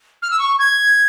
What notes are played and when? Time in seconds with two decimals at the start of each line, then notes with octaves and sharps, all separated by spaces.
0.22 F6
0.31 E6
0.39 C#6
0.59 G#6